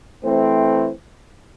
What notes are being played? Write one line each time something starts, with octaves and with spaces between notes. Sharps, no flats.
E3 A3 C4